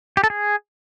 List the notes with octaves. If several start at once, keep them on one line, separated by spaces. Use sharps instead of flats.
G4
A4
G#4